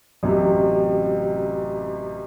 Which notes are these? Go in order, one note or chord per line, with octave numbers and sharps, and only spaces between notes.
A1 F#2 C3